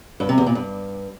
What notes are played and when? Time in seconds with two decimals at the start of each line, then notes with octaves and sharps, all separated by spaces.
0.20 G2
0.29 C3
0.38 E2
0.47 A#2
0.55 G2